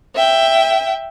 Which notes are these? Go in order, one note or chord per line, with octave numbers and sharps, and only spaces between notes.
E5 G5